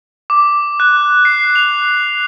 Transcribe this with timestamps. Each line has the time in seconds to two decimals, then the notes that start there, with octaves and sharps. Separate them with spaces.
0.30 D6
0.80 F#6
1.25 C7
1.55 F7